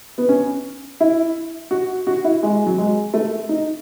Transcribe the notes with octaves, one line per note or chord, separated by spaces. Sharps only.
B3
C#4
E4
F#4
F#4
E4
G#3
F#3
G#3
A3
D#4